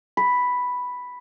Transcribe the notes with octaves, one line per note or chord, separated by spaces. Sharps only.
B5